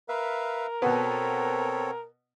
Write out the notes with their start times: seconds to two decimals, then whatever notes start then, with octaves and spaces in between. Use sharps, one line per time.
0.09 A#4 B4 E5 F5
0.82 B2 B3 C4 A4 C#5